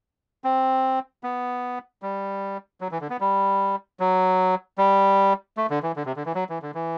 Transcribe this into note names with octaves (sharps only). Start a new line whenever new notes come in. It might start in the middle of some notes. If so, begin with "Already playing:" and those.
C4
B3
G3
F#3
E3
D3
B3
G3
F#3
G3
A3
D3
E3
D3
C3
D3
E3
F#3
E3
D3
E3